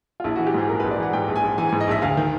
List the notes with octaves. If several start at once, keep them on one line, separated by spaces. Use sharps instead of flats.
F4
A#1 E4
E3 F#4
G4
G#2 G#4
A#1 A#4
A#1 B4
D5
E3 F#5
G#2 G5
A#1
G#5
A#1
E3 G#5
G#2 G#5
D#5
A#1 E5
D2 F5
D#3